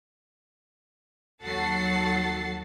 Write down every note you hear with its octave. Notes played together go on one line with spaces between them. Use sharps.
D#2 F#3 A4 F#5 A6 C7